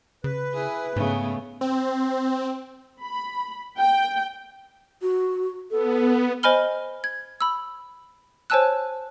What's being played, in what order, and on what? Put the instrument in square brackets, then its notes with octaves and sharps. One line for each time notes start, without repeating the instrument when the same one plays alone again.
[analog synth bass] C#3 [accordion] B4
[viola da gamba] E4 G#4
[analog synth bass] G#2 [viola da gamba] C#3 A3 B3
[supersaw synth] C4
[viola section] B5
G5
[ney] F#4
[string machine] B3 [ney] A4
[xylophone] C5 D#5 G#5 B5 F6 G7
G#6
B5 E6
C5 C#5 G#5 A5 E6 F#6